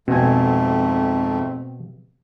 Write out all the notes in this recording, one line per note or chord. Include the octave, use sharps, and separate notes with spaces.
F2 G#2 B2 A3 C4 G#5